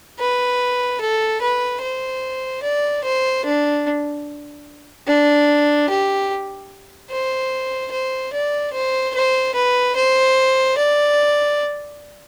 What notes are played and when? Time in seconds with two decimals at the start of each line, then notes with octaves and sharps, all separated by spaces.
0.19 B4
1.01 A4
1.42 B4
1.82 C5
2.63 D5
3.04 C5
3.45 D4
5.07 D4
5.89 G4
7.11 C5
7.92 C5
8.33 D5
8.73 C5
9.14 C5
9.55 B4
9.96 C5
10.78 D5